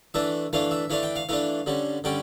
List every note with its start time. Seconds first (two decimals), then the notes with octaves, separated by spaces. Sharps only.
0.14 E3 A3 D4 E5
0.53 E3 A3 D4 F5
0.71 E5
0.90 E3 A3 D4 F5
1.03 G5
1.16 F5
1.29 E3 A3 D4 F5
1.66 D3 G3 C#4
2.04 D3 G3 C#4 G5